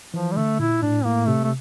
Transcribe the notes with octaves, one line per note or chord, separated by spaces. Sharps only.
E3 F3
G3
D3 A3
A#2 E4
A2 D4
A2 A#3
C3 A3
A3